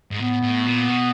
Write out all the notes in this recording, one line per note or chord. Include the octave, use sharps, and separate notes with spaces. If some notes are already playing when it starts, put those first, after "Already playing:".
G#2
A2 B3
A2
A#2
B2